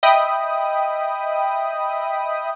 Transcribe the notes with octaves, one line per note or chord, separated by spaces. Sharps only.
D#5 E5 G5 B5 D#6